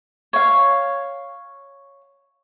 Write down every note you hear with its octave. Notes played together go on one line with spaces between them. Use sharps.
C#5 F5